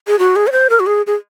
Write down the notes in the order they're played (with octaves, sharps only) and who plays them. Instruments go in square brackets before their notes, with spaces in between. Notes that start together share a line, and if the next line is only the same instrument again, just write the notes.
[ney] G#4
F#4
G#4
C#5
C5
A#4
F#4
G#4
G#4